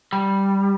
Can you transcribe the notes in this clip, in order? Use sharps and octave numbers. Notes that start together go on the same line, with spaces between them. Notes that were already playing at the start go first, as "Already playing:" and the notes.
G3